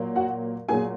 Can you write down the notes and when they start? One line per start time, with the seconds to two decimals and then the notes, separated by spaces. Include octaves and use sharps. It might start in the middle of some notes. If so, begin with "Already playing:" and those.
Already playing: A#2 F#3 A#3
0.16 F#4 F#5
0.69 A#2 F#3 A#3 G#4 G#5